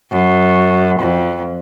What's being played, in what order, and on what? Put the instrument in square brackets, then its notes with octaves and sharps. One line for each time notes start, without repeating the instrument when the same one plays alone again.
[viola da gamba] F#2
F2